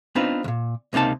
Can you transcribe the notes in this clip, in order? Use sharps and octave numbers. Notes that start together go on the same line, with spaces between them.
B3 C4 D4 D#4 F4 B4
C#2 A#2
C#2 C3 A#3 D#4 A5